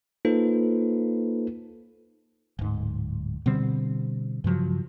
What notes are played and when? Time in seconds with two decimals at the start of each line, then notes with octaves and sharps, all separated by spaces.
0.25 A#3 D#4 F4 A4 B4 C5
2.59 D1 G#2
3.46 B2 D3 G3 C4
4.44 G2 C#3 F3 F#3